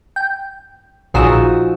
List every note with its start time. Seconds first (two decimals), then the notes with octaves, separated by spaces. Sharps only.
0.16 G5
1.14 A#1 F3 D#4 F#4 G#4 E6